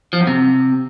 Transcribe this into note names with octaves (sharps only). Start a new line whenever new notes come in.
F3
F#2
C3